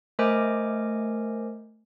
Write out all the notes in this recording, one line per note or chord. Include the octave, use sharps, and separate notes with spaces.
A3 A#4 C5 D#5 G#5 D6